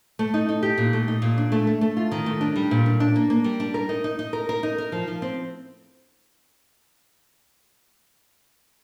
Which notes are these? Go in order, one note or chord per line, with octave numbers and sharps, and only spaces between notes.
A3
D#4
D#4
G4
A#2
A3
D#4
A#2
D4
A3
A3
A3
F4
D#3
A3
D4
G3
A#2
D4
D4
A#3
A#3
G3
D4
A#4
D#4
D#4
D#4
A#4
A#4
D#4
A#4
F3
F3
C4